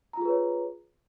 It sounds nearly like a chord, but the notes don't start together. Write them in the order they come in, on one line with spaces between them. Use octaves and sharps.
A#5 F4 G#4 B4 C#5